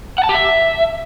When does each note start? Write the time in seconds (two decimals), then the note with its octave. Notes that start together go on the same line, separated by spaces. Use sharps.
0.18 F#5
0.24 A5
0.29 G4
0.34 E5